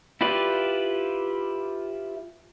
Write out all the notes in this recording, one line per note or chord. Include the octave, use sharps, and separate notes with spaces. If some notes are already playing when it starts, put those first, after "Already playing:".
E4 F4 G4 B4 D5